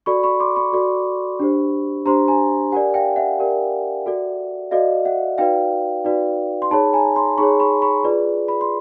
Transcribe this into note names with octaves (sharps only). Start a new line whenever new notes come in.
F#4 A4 D5 B5 C#6
B5 C#6
C6 D6
B5 C#6
F#4 A4 D5
D4 G4 C5
D4 G4 C5 A#5 C6
G#5 A#5
G4 A#4 D5 F#5 G#5
F5 G5
E5 F#5
G4 A#4 D5
F#4 A4 D5
F#4 A4 D5 D#5 F5
E5 F#5
D#4 F#4 B4 D5 F5 G5
D#4 F#4 B4 D5
C6
D#4 G#4 C#5 A5 B5
G#5 A#5
A#5 C6
D#4 G#4 C#5 B5 C#6
B5 C#6
B5 C#6
F4 G#4 B4 D5
B5
C6